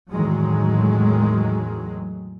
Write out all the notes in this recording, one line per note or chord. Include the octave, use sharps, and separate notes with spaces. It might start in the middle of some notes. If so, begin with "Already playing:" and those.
E2 A2 D#3 F#3 G#3